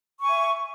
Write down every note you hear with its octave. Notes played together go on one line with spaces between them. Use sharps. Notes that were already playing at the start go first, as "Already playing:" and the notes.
E5 G#5 C#6